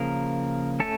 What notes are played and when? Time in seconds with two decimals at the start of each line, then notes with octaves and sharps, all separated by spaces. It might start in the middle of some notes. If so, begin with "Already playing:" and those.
Already playing: C#3 F3 A#3 A#4
0.80 A3 C#4 A4